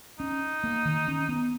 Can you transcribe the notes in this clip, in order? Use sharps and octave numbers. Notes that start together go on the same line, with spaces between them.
C#4 D#4
A#3
D#3
C#4
B3